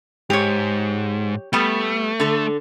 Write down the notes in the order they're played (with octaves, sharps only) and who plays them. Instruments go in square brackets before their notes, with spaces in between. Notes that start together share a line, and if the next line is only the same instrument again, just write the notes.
[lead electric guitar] G#2 [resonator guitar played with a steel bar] G4 C#5
[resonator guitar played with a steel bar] G3 B3 [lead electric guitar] A3
[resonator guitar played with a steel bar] D3 A4